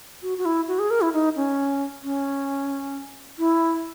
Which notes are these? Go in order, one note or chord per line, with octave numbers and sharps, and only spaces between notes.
F#4
F#4
E4
F#4
G#4
A#4
E4
D#4
C#4
C#4
E4